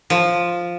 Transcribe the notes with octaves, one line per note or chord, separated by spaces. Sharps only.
F3